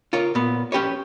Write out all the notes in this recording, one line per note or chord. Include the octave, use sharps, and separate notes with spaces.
F4 A#4 C#5
A#2 B3
C#4 G4 B4 C#5